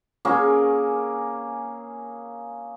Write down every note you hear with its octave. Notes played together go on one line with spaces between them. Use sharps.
A#3 C#4 G#4 A#4